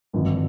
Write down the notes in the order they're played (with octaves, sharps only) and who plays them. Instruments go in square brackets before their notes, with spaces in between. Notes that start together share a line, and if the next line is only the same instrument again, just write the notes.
[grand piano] G#1 G2 D3 F3